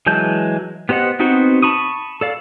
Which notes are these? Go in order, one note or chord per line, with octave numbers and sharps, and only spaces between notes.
E3 F#3 G#3 A5 G6
B3 G4 C5 D#5 F#5
B3 C4 D#4 F#4 C5
A5 B5 C#6 D#6
A4 D5 F5